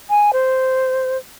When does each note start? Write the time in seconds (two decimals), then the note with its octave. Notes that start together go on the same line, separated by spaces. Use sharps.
0.10 G#5
0.33 C5